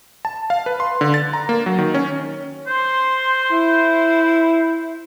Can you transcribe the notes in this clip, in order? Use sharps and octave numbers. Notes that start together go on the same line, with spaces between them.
A5
F5
B4
C6
D3
A6
A#5
A#3
F#3
D#3
C#4
C5 C6
E4